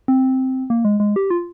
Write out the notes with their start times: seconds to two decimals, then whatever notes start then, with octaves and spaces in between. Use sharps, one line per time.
0.08 C4
0.70 A#3
0.85 G#3
1.00 G#3
1.16 G4
1.30 F4